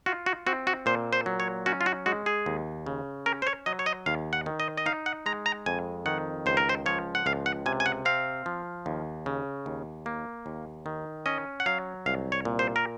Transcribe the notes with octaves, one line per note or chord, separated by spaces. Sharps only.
F4 F#4
F#4
C4 F#4
F#4
A#2 C5
C5
F#3
C#5
C#4 F#4
F4
F#4
G#3 F#4
G#4
D#2
C#3
C#4 A#4
C5
C#5
F#3 D#5
C#5
D#5
D#2 F5
F#5
D#3
D#5
D#5
D#4 F5
F#5
G#3 A#5
A#5
F2 G#5
D#3 F#5
C#2 C5
A#4
C5
F3 C#5
F#5
C#2 F5
F#5
C3 G#5
G#5
F#5
C4 F5
F3
D#2
C#3
D#2
A#3
D#2
D#3
C#4 D#5
F#5
F#3 F5
C2 F5
C#5
A#2
C5
A#4